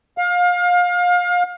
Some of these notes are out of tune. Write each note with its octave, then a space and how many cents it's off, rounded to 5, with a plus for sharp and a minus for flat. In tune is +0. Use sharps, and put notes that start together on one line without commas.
F5 +30